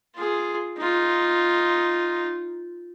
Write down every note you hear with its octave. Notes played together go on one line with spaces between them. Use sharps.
F4 G#4
D#4 F4